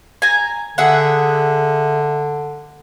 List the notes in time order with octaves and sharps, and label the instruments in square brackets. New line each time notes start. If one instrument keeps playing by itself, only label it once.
[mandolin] G#5 A#5
[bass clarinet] D3 [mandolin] G#4 E5 F#5